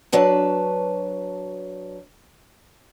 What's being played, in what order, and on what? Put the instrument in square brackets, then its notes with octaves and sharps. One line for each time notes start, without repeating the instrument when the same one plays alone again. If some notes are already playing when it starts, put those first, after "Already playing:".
[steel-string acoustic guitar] F#3 D4 B4 A5